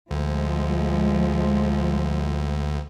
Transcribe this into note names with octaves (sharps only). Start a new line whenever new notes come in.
D2 F3 G#3